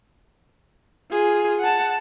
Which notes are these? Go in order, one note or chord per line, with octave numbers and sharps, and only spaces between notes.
F4 G#4
F#5 A5